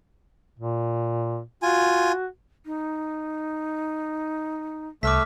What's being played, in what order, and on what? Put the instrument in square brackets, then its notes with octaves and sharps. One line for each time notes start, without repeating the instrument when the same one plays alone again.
[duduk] A#2
[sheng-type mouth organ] F4 G#5 [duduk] F#4
[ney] D#4
[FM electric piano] C2 [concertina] A3 E5 [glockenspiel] D6 F6 B6